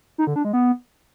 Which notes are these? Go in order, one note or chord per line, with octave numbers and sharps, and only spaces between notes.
D#4
D3
D4
G#3
B3